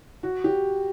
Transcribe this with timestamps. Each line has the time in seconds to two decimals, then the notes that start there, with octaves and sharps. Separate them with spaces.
0.23 F#4
0.44 G4